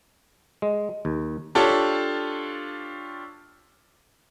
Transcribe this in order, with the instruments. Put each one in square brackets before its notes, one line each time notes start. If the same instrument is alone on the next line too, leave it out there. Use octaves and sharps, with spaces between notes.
[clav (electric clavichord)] G#3
D#2
[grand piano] D4 F4 G4 A4 C#5